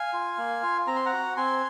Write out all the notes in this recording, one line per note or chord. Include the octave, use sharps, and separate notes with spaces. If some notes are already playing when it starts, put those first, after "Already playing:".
Already playing: F5 G#5
F4
A#3
F4
C4 A#5
C6
F#5 A#5
F#4
C4 G#5 C6